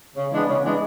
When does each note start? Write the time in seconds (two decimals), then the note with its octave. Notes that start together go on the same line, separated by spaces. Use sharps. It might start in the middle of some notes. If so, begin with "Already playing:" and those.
0.16 C#3
0.32 E3 G#3 B3 D4
0.48 C#3
0.64 E3 G#3 B3 D4